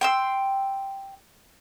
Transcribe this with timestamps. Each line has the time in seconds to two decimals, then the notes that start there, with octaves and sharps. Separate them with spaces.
0.01 G5 C6 E6